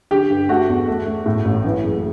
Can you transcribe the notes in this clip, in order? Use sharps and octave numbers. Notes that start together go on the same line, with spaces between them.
D3 G4 G5
G2
A3 F#4 F#5
E2
A3
A3
A2
A1
E3
F#1